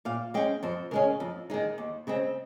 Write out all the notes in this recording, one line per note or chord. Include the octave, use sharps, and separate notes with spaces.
A#2 F5
G#3 C#4 G5
F2 C5
C#3 G#3 C#4 A#4
F2
D#3 G#3 D#4
D#2
C#3 G#3 C4